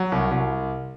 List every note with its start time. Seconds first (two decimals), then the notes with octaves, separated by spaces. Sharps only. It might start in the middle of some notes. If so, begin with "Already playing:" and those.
Already playing: F#3
0.12 C2
0.31 C2